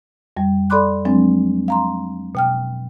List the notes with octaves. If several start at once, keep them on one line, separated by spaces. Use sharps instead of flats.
F2 G3
A4 D5 B5 C6 D6 F#6
F3 F#3 G#3 C4 D4
F5 A#5 C6
B2 G5 F6